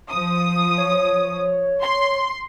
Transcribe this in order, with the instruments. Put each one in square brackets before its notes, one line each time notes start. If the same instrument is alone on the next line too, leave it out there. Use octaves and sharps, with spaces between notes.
[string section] F3 D#6
[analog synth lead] C#5
[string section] C6